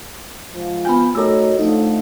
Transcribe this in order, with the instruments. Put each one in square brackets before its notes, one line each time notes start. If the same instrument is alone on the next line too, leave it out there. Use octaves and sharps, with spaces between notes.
[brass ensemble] G#2 F3
[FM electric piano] B3 F4 G5 [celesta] G#5 B5
[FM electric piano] A3 A#4 [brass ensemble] D#4 F#4 C#5 [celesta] A4 E6
[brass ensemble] D3 F3 A3 [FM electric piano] D#4